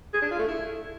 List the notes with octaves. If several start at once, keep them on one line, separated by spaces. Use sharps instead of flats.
G#4
D4
F4
A3
E4